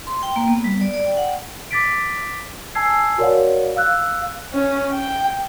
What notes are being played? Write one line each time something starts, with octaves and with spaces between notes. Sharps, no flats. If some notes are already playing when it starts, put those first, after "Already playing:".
C6
G5
A#3
B3
G3
D5
D5
G5
F#5
D6 A6 B6 D7
G#5 A5 E6 G#6 C7
F#4 A#4 C#5 D5 F5 F#5
F5 E6 F#6
C#4
G5